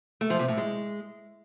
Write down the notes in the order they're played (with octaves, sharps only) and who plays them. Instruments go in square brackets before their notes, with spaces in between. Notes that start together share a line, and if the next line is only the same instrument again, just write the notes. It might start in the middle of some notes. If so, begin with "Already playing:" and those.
[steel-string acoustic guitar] A3
F3
C3
A2
G#3